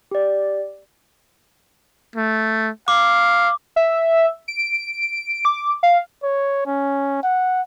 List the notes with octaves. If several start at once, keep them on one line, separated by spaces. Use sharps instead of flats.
G4 D5
A3
F5 D6
E5
D7
D6
F5
C#5
C#4
F#5